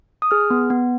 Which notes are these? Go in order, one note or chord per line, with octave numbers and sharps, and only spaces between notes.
D#6
G#4 F6
B3
B3